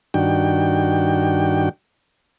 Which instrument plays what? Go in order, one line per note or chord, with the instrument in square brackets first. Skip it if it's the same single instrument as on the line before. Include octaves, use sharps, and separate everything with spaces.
[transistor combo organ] G2 D#3 D4 F#4 G5